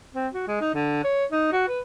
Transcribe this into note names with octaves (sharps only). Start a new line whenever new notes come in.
C4
F#4
G#3
D#4
D3
C#5
D#4
F#4
B4